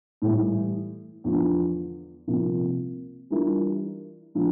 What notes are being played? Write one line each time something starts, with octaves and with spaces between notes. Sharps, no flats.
A2 E3 G3
E2 D3 F3
C2 C3 F3 A#3
E3 G3 D4 F4 A#4
D3 F3